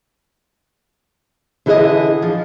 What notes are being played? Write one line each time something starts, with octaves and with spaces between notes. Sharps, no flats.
D3 E3 E4 G#4 C5 D#5
F3